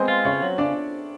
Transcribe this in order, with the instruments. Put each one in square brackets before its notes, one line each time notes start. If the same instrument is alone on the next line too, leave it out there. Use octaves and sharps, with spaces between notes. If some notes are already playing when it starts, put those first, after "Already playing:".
Already playing: [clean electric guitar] G#3 [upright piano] B3 C4 C5
[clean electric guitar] F4
[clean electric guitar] C#3 [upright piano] C#4 C#5
[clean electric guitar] F#3
[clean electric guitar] C#3 [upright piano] D4 D5